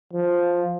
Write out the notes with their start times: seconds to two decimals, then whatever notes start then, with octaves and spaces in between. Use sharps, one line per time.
0.14 F3